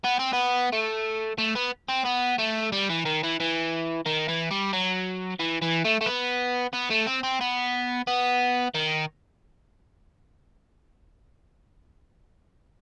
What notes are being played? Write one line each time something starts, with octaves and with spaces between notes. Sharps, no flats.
B3
C4
B3
A3
A3
B3
C4
B3
A3
G3
E3
D#3
E3
E3
D#3
E3
G3
F#3
E3
E3
A3
A3
B3
B3
A3
C4
C4
B3
B3
D#3